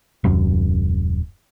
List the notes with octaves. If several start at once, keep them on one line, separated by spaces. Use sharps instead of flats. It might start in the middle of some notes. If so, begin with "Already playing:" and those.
D#1 F#2